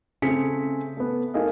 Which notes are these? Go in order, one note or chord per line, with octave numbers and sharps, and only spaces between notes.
C#3 A3 C4 G#4 B6 C#7
A3 B3
A3 D#4 G#4 A#4 D#5 F5